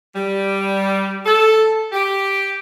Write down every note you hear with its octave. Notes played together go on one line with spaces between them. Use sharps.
G3
A4
G4